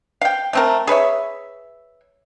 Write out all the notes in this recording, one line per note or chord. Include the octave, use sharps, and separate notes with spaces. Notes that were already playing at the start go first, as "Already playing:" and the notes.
F5 G5
A3 C4 A#4
G#4 B4 C#5 E5